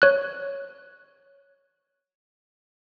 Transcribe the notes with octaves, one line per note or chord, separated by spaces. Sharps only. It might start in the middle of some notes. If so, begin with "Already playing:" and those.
C#5 F#6